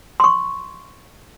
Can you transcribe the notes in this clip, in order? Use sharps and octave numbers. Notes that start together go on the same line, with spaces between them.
C6 C#6